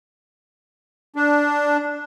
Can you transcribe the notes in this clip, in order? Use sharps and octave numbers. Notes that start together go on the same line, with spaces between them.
D4